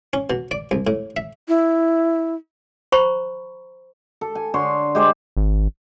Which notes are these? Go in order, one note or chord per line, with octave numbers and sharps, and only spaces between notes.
C#4
B2
D5
C2
A2
E5
E4
C5 A#5 B5 C#6
A4
G#5
D3 C#5 C6
G#3 G4 C5
G#1